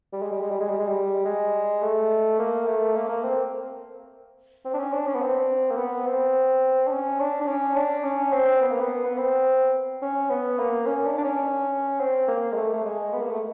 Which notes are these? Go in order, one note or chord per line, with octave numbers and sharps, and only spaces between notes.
G3
G#3
G3
G#3
G3
G#3
G3
G#3
G3
G#3
A3
A#3
A3
A#3
A#3
C4
C4
D4
C#4
D4
C#4
B3
C4
A#3
B3
C4
D4
C#4
D4
D4
C#4
D4
C#4
C4
B3
A#3
B3
B3
C4
C#4
B3
A#3
C#4
D4
D4
C#4
C4
A#3
G#3
A3
A3
G#3
B3
A#3
A3